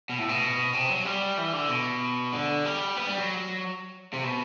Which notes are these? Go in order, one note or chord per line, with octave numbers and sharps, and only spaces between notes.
B2
A2
B2
C3
F#3
G3
E3
D3
B2
D3
G3
B3
G3
F#3
C3
B2